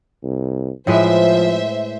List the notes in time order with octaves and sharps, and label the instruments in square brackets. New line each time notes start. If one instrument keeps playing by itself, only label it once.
[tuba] C2
[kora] A2 G#3 B4 [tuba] F3 [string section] C5 E5